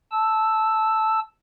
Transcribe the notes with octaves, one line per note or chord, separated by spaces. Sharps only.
A5 E6